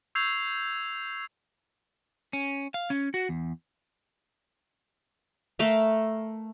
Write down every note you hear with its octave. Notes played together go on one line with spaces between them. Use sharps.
C#6 E6 G6 G#6 C7 F7
C#4
F5
C#4
F#4
E2
A3 A#4 E5 F5